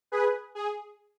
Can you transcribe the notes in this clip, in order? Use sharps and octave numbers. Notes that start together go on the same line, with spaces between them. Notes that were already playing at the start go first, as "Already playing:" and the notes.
G#4 B4
G#4